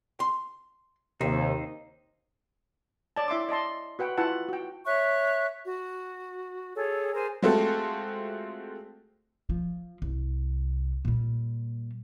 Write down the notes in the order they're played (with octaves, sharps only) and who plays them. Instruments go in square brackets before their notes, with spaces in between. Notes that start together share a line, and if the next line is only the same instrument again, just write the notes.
[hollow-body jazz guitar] C6
[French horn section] D#2 [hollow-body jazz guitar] C3 [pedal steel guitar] D#4 C5
[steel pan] C#5 D5 A5
E4 E5 C6 D6
D5 D#5 A5 C6
F#4 B4 F#5 G5
E4 F4 B4 F#5 A5
F#4 G5
[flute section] C#5 E5 C#6 F#6
F#4
G#4 A4 C#5
G#4 A#4 C5 G#5
[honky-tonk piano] G#3 A3 C4 F4 F#4 A4
[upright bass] F3
C2
A#2 G3